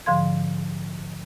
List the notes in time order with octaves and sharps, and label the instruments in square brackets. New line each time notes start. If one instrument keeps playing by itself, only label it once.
[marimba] G#2 D3 F3 F5 C6 G#6